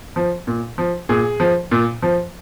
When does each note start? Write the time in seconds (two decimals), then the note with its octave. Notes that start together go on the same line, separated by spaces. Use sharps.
0.16 F3
0.47 A#2
0.78 F3
1.09 A#2 G#4
1.40 F3
1.71 A#2
2.03 F3